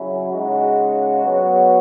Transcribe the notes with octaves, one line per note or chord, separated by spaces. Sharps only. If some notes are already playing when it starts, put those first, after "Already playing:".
Already playing: C#3 F#3 C#4 E4
C#3 G#3 D#4 F#4
F#3 B3 F#4